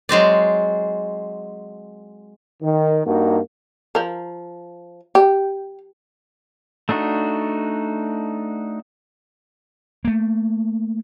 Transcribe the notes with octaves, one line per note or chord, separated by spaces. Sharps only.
F#3 G#3 C4 D5
D#3
G2 A#3 D#4 F#4
F3 A#4
G4
A3 D4 D#4 F#4
A3 A#3